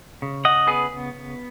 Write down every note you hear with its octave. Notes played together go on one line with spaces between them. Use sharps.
C#3
D#5 F#5
B3 G#4 B4